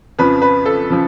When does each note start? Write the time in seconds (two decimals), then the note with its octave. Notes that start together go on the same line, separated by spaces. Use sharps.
0.19 F2 C#3 F3 B4
0.42 B4
0.66 A4
0.90 C#3 F3